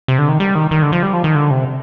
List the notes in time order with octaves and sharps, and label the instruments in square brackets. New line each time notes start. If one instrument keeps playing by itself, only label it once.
[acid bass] C3
D3
D#3
G3
D#3
D#3
D3
F3
G3
F3
D#3
D3
C3